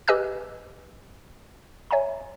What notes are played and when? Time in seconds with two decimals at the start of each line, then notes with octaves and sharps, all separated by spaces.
0.08 G4 B4 D#5 G#5 E6 F#6
1.91 C#5 E5 G#5 A#5